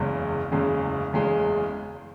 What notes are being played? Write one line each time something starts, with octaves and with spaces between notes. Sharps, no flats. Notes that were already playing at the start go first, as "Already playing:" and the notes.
Already playing: F#1 E2 C#3 G#3
F#1 E2 C#3 G#3
F#1 E2 C#3 G#3